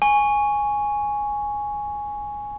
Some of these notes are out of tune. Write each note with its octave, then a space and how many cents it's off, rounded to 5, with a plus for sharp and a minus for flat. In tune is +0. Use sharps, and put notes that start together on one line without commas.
G#5 +0 C#6 +5